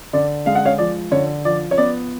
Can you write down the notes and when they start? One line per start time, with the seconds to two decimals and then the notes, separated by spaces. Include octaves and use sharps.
0.13 D3 D5
0.46 G#3 F5
0.55 F#5
0.65 C#5 F5
0.78 F3 D5
1.11 D3 C#5
1.45 F3 D5
1.71 C#5
1.78 B3 D5